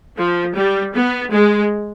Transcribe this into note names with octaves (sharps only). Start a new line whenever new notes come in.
F3
G3
B3
G#3